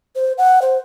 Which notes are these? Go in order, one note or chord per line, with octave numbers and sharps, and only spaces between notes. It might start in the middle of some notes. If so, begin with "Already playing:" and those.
C5
F#5
C5